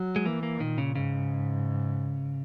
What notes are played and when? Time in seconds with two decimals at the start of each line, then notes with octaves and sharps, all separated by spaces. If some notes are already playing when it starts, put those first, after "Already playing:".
Already playing: F#3
0.16 G#3
0.25 E3 A#3
0.43 A#3
0.60 A#2 D#3
0.78 C#3
0.95 G#2 C#3